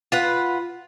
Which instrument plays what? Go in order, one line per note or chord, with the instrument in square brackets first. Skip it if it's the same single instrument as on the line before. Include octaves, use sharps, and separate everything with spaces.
[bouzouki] F4 B4 F#5